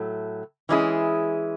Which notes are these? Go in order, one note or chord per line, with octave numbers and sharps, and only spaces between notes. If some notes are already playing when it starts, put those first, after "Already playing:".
Already playing: A2 F#3 A3
E3 G#3 C#4 E4 G#4